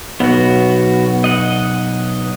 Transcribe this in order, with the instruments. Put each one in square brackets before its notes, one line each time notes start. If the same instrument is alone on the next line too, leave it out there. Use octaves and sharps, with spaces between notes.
[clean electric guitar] B1 [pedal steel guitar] B3 F#4
[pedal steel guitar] D#5 F#5